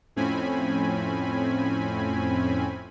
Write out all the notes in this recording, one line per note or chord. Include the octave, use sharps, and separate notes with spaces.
F2 A2 C4 C#4 G#5 B5